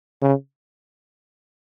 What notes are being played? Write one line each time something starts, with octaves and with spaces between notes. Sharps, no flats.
C#3